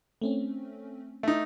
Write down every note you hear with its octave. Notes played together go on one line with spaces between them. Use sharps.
A3 C4 C#4
A3 D#4